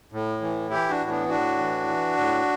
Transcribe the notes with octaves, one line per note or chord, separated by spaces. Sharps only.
A2
E3
E3 E4 G4
D4 F#4
A2
B3 D4
A2 D4 F#4
E3
E3
A2